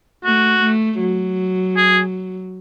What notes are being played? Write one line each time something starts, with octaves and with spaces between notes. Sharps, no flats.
A3 F#4
A3
F#3
G#4